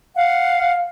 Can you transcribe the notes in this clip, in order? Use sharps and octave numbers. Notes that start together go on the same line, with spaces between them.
F5 F#5